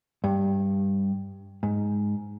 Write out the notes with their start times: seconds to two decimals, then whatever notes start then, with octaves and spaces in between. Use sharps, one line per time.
0.24 G2
1.63 G#2